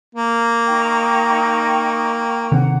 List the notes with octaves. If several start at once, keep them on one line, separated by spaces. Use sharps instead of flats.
A#3
D#4 G5 C#6
C3 D#3 C4 F#5